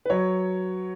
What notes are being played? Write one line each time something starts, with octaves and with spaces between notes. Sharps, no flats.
B4
F#3 C#5